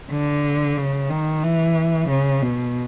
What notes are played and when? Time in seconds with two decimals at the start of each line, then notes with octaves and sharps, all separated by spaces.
0.11 D3
0.77 C#3
1.10 D#3
1.43 E3
2.09 C#3
2.42 B2